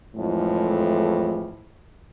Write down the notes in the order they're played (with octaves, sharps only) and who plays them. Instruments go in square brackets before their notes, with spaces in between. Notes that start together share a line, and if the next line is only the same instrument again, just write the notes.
[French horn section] F2 A2 E3 G#3